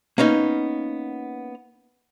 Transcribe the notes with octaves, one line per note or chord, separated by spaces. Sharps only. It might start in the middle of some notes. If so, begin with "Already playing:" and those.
A#3 B3 C#4 D#4